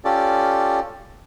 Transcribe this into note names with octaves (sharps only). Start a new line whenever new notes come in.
C#4 F4 G4 A4 D5